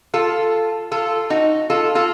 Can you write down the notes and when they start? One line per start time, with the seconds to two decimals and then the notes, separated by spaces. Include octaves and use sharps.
0.14 F4 A4
0.92 F4 A4
1.30 D#4 F#4
1.70 F4 A4
1.95 F4 A4